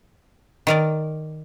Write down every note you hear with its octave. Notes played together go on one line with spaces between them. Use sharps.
D#3 A#4 D5